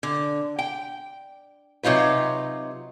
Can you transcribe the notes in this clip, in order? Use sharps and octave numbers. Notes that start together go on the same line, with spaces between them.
D3
G5
C3 F#3 D#4 F4 B4